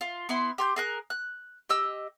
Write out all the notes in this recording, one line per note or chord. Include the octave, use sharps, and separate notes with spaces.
F4
B3 E4 C6
G4 C6 G6
G#4 A#4 F#6
F#6
G4 D#5 E6